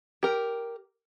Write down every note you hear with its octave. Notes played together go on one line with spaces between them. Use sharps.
G4 A#4